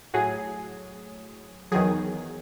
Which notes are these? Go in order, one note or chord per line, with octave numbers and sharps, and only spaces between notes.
A2 F#3 G#4
E2 D#3 F#3 G#4